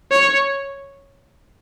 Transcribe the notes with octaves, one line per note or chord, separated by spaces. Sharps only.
C#5